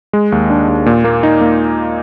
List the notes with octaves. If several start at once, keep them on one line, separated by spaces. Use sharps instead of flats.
G#3
D#2
D4
D#2
A#2
A#3
D#4
A#3